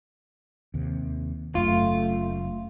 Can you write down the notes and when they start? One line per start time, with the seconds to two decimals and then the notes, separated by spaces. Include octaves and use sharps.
0.74 D#2 C3
1.55 F#1 F#2 A3 F4